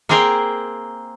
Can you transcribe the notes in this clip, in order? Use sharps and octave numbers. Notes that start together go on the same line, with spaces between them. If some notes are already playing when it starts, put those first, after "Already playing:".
A#3 C4 G#4 A#4 C5 G5